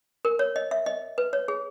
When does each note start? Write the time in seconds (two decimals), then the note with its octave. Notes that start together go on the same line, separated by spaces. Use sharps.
0.25 A#4
0.39 C#5
0.56 D#5
0.71 E5
0.86 D#5
1.18 B4
1.33 C#5
1.48 G#4